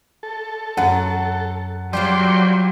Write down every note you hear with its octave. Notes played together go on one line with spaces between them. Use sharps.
A4
F#2 F#5
F#3 G3 F4 C5 D5 G5 C6